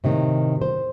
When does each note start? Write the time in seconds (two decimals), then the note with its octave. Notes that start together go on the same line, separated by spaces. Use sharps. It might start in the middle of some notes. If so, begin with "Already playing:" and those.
0.04 A2 C3 D#3
0.61 C5